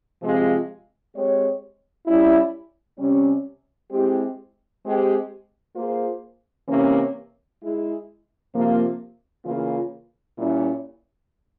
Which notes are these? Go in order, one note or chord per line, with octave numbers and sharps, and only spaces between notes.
C3 F3 G#3 C4 F4
G#3 C4 G4 C#5
G3 C#4 E4
C3 G3 C#4
G#3 C4 E4 G4
G#3 C4 G4 C5
A#3 F4 G#4 C5
C3 E3 A#3 C#4
G#3 E4 G#4
C3 F3 A#3 F4
C#3 E3 A#3 F4
A#2 G3 C#4 E4